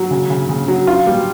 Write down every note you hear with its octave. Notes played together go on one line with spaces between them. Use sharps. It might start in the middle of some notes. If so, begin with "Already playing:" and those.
Already playing: F#3
C#3
C#3
C#3
F#3
F4
G3